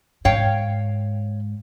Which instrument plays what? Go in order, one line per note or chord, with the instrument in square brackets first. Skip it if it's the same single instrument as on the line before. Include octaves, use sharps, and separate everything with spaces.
[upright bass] G#2 [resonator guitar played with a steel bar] C#5 F5 G5